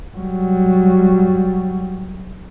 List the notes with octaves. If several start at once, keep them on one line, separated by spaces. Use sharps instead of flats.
F#3 G3